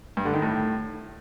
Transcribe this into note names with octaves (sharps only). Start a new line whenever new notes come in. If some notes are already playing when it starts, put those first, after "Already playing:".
G2
D3
D#3
A2